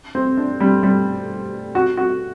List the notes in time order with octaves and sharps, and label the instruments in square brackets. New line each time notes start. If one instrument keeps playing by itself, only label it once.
[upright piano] C4
D4
G3
G3
F#4
F#4